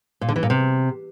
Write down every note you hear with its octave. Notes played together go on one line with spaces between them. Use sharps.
A#2
D3
E3
A#2
C3